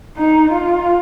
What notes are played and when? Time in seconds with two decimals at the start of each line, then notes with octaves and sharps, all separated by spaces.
0.17 D#4
0.52 F4